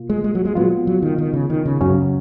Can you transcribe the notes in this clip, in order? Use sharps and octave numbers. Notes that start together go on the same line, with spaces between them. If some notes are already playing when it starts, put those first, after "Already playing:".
Already playing: B2 A#3 F4
G#3
G#3
F#3
G#3
A#2 F#3 G#3 B3 F4
F#3
D#3
D#3
C#3
D#3
C#3
C#2 F#2 C#3 F#3 C#4